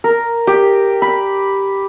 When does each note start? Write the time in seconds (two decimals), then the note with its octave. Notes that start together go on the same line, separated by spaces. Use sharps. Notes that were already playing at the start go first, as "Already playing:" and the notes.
0.04 A#4
0.47 G4
1.02 B5